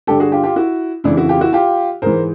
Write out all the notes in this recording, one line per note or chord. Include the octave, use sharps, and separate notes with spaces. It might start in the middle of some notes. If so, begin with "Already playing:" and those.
G2 D3 G4 A4
F#4 G#4
F4 G4
F4 G4
E4 F#4
F2 C#3 E3 D4 E4
E4 F#4
F4 G4
E4 F#4
F4 G4
G#2 E3 A#4 C5